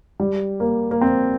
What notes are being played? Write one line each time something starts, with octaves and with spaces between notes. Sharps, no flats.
G3
A#3
A#3
C4